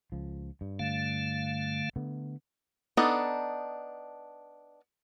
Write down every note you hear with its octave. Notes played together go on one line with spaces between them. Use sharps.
C#2 F3
G2
D3 A3 F5
D3 A3 B3
B3 D4 D#4 A4